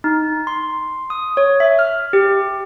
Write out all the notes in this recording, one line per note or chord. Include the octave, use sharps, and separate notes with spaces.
D#4
C6
D#6
C#5
E5
F6
G4